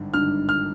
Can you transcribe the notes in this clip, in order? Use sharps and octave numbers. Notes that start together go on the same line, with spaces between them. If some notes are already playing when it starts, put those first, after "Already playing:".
Already playing: G#1 G2 D3
G#1 G2 D3 F6
F6